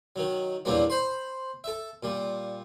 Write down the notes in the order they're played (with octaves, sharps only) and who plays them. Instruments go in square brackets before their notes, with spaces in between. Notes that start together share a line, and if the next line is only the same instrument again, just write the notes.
[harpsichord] D#3 F#3
E2 A#2 F#3 G3 A#3 D4
C5 B5 C6
A4 E5
A#2 G3